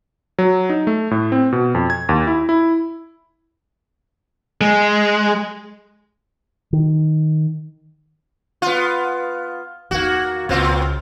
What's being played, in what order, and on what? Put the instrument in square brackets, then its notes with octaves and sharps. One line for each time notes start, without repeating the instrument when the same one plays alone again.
[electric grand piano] F#3
D#4
A3
A2
C4
B2
F2
G#6
D#2
E4
E4
[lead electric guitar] G#3
[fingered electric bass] D#3
[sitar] B3 F4
[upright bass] E2 D#3 [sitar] A#3 F#4
[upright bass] C#2 [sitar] A#2 C4 F4